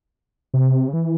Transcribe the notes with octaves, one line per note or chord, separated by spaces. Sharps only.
C3
C#3
E3